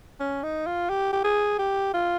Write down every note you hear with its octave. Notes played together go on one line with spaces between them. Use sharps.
C#4
D#4
F4
G4
G4
G#4
G4
F4